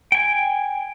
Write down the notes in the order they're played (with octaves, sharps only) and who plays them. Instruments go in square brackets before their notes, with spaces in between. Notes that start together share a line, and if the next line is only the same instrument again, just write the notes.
[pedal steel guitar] G5 G#5